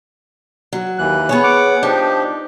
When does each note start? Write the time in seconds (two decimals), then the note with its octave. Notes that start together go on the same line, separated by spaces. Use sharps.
0.73 F#3
0.98 D#2 E3 F#6
1.29 B3 G#4 C#5
1.43 F#5 D6
1.83 F3 D4 D#4 G4